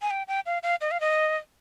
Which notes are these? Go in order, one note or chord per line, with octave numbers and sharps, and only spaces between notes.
G#5
G5
G5
F5
F5
D#5
F5
D#5